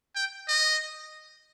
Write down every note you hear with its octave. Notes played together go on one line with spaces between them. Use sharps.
G5
D#5